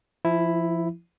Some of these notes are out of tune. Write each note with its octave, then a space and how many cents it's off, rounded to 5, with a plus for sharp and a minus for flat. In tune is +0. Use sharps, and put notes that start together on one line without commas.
F3 -30 E4 +0